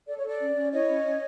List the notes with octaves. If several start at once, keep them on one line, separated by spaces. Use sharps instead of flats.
A4 D5
C#5
A4 D5
C#4
C#4
E4 C#5 D#5
C#4
C#4